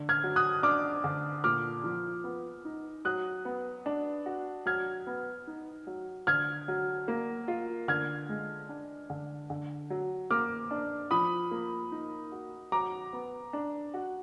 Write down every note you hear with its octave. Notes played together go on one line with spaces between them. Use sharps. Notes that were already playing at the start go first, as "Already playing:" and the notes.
Already playing: D3
F6 G#6
F#3
D#6 F#6
D4 D6 F6
D3
A#2 D6 F6
F3
B3
D#4
F#3 D#6 F#6
B3
D4
F#4
F#3 F6 G#6
B3
D#4
F#3
D3 F6 G#6
F#3
A#3
F4
D3 F6 G#6
G#3
D4
D3
D3
F#3
A#3 D6 F6
D4
F3 B5 D#6
A#3
D#4
F#4
F#3 A#5 D6
B3
D4
F#4